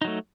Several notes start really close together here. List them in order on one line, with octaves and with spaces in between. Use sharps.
D#4 F#3 A3